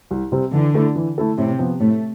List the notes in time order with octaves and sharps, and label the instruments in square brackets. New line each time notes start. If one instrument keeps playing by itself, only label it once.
[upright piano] C2
C3 G3 C4
[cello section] D3 [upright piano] E3
[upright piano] A3 E4 A4
E3
A3 E4 A4
[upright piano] A2 [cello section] C3
[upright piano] F3 B3
[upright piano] A2 [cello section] A3